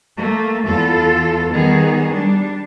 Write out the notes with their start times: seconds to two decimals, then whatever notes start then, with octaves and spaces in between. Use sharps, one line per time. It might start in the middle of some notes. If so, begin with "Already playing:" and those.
0.18 A3 A#3
0.67 E2 F4 A4
1.52 D#3 G3 B3 G#4
2.11 G3 D4